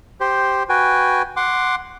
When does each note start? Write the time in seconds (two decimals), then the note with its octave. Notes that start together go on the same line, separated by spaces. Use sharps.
0.20 G4 C5
0.69 F#4 B4 G5 G#5
1.37 F#5 C6 D6